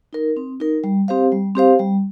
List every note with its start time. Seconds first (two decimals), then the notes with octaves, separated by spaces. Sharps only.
0.13 D#4 A#4
0.37 C4
0.60 D#4 A#4
0.84 G3
1.08 C4 G4 C5 F5
1.32 G3
1.55 C4 G4 C5 F5
1.79 G3